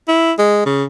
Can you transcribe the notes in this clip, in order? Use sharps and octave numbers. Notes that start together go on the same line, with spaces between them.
E4
G#3
C#3